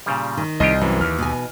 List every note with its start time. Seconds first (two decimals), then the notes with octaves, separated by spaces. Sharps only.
0.06 A#2 C#3 G3
0.37 D#3
0.60 C2 E4 F4 G4 D#5
0.81 F#2 E3
1.01 D#2 F6
1.19 B2 D#4 G#5